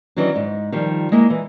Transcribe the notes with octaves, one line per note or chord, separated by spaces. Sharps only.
D#3 E3 F#3 C#4 D4
G#2
D#3 F3 G3
G#3 A#3 E4 E5
E3